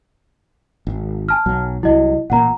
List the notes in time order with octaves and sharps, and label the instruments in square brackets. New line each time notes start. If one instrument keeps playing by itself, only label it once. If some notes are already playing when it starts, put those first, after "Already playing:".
[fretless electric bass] G#1
[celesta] G#5 A5 F6
[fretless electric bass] B1 F#3
[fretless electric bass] C2 F#3 [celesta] E4 D#5
[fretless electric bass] A1 A#2 A#3 [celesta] F#5 A#5